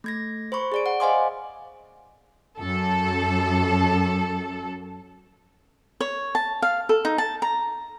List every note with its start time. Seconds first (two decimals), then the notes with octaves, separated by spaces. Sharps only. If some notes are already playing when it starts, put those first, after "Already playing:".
0.04 A3 G#6 A#6
0.52 C5 B5 C#6
0.72 G#4 D5 D7
0.86 F#5
1.00 C5 D#5 F5 G#5 C6 D6
2.58 F#2 A4
6.00 C#5
6.35 A5
6.62 F5
6.89 A4
7.05 D#4
7.18 A5
7.42 A#5